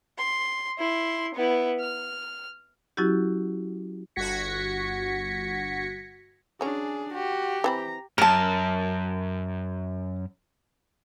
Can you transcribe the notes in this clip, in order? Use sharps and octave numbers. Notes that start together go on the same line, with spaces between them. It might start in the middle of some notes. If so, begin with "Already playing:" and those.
C6
E4 C6
B3 E4
F6
F#3 C#4 E4 F#4 G4
G1 F#4 G#6 A#6 B6 C#7
F#3 C#4 D4 G#4
F#4 G4
E3 C4 A#5 B5
F#2 A#4 A5